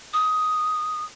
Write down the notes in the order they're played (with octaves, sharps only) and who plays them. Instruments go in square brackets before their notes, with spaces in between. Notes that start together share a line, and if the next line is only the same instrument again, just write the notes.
[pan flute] D#6